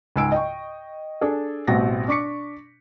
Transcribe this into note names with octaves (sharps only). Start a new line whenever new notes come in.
C#2 G#2 G#5 E6 D7
D#5 G5 C#6
D4 G#4 A4
A1 B2 G3 C4 F#5 A#6
D4 C#6 D6 B6 C#7